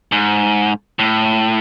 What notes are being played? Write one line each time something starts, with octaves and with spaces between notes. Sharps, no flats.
G#2
A2